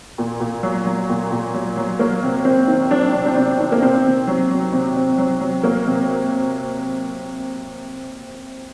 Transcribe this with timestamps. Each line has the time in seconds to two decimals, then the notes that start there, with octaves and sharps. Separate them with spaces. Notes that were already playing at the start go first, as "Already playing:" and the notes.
0.18 A#2
0.40 A#2
0.63 F#3
0.86 F#3
1.09 A#2
1.31 A#2
1.54 F#3
1.77 F#3
1.99 F#3 A#3
2.22 C3
2.45 C3 C4
2.68 D#3
2.91 F#3 D4
3.13 C3
3.26 C4
3.36 C3 D4
3.59 D#3
3.72 A#3
3.82 C3 C4
4.05 C3
4.27 F#3
4.50 F#3
4.72 C3
4.96 C3
5.18 F#3
5.40 F#3
5.63 F#3 A#3
5.86 C3